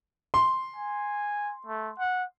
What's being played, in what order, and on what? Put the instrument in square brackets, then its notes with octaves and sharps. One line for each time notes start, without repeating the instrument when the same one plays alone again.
[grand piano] C6
[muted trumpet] G#5
A3
F#5